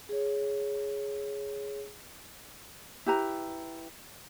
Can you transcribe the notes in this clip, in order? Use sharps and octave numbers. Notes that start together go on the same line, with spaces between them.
G#4 C#5
E4 G4 B4 A#5